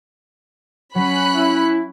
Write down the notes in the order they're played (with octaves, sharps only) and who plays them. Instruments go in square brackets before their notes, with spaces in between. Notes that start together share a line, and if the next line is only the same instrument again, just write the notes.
[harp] F#3 B6 [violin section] C#4 B5 F#6
[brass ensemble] E4